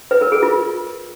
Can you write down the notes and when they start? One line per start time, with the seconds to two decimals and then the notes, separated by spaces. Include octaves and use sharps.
0.11 B4
0.21 A#4
0.32 G#4
0.42 F4